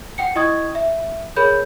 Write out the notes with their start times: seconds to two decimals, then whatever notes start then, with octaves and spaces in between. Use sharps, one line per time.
0.18 F#5 G5 C#7
0.36 E4 D#5 G5 C#6 D#6 G#6
0.75 E5
1.36 G#4 A#4 C#5 B5 G6